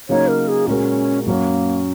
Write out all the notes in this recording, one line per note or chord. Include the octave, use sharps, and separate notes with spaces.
C#3 F#3 A#3 D#4 C#5
A#4
G#4
A#2 G#3 C#4 F#4 A#4
F#2 F#3 A#3 C#4